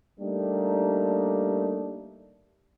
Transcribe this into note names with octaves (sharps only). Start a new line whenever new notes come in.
G3 A3 A#3 D4 D#4 G4